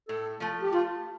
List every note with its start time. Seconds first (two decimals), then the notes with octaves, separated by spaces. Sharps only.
0.08 A2 A4
0.40 F3 A3
0.62 G4
0.72 A3 F4